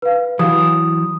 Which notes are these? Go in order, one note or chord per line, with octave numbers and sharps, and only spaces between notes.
B4 F5
E3 F#3 D#6